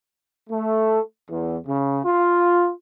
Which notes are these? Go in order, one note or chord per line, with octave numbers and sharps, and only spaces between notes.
A3
E2
C#3
F4